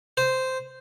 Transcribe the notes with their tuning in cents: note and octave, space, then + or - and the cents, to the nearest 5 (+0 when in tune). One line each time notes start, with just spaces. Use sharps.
C5 -10